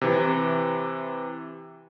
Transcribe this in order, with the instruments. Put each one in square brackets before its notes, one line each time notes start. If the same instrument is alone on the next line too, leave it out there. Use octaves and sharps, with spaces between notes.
[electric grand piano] C3 E3